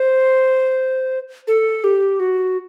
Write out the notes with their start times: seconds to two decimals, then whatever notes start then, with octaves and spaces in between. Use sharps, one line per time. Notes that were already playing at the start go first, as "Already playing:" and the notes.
Already playing: C5
1.48 A4
1.84 G4
2.20 F#4